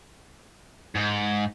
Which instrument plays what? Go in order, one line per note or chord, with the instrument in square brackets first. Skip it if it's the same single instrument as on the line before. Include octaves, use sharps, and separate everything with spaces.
[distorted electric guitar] G#2